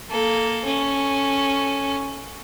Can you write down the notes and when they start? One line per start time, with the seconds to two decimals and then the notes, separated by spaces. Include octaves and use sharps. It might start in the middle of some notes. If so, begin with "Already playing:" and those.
0.10 A#3 A4
0.65 C#4 A4